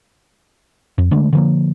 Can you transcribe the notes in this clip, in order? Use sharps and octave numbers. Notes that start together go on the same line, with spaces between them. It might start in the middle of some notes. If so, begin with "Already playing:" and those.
F2
D3 G#3 A3 D4
D3 F3 A#3